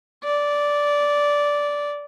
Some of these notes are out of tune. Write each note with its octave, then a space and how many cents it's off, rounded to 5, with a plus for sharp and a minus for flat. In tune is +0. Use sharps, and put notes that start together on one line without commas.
D5 -10